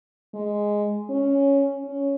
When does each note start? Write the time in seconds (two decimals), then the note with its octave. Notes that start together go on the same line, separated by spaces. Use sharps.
0.34 G#3
1.10 C#4
1.86 C#4